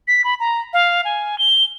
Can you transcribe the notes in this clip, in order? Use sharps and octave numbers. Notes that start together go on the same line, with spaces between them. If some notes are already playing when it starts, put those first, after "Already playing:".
B6
B5
A#5
F5
G#5
G7